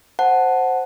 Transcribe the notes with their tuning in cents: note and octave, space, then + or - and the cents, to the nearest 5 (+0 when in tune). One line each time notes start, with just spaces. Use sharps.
C5 +0 F#5 +0 A5 +0